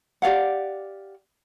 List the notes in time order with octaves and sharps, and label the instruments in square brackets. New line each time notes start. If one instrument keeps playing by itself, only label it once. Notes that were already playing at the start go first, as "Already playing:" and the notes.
[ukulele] G4 D5 F5 F#5